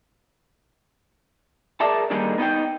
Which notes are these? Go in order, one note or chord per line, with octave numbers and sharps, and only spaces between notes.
G#4 A#4 D5 E5 A5
D3 D#3 G3 A#3 D#4 G#4
B3 D#4 D#5 G5